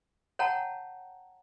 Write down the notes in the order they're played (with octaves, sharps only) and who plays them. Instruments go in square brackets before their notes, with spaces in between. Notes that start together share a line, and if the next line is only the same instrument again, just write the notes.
[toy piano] C#5 F#5 G5 A5 A#5